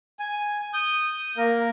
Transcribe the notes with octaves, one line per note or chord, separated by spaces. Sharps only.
G#5
D#6 G6
A#3 A#4